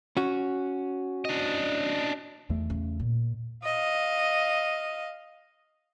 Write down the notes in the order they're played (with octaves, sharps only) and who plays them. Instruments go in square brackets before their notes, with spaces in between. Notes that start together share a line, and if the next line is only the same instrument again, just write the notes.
[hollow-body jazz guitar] C#4 F#4
[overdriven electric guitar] D4 D#5
[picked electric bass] E2 A3 [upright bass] D#3
[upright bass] C#3
A#2
[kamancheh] D#5 F5